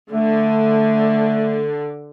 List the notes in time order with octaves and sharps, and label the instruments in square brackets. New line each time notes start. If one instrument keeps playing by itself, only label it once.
[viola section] D3 [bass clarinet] A3